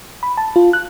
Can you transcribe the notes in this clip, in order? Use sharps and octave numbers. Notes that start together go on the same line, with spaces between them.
B5
A5
F4
F#6